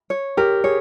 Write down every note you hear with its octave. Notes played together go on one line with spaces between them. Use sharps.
C#5
G4 A#4
G#4 C#5